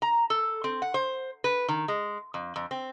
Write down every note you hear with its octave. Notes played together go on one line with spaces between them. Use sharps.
A#5
A4
C4
F#5
C5
B4
D#3
G#3
F2
F2
C4